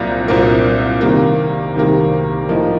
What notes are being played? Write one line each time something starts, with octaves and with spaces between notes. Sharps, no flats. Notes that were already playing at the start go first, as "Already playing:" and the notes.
Already playing: C2 A#2 F#3 A#3
C2 A#2 F#3 A#3
C3 D#3 G3 A#3
C3 D#3 G3 A#3
A2 F3 A#3 D#4